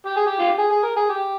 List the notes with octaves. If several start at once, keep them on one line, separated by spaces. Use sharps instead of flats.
G4
G#4
G4
F4
G4
G#4
G#4
A#4
G#4
G4